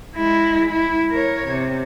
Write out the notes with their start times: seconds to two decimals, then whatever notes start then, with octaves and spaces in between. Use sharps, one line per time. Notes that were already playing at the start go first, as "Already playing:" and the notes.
0.17 G#3 E4
0.71 E4
1.11 A#4 C#5
1.48 C3